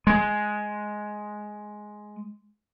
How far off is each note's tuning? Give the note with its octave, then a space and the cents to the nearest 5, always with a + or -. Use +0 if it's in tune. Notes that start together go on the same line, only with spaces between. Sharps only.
G#3 +10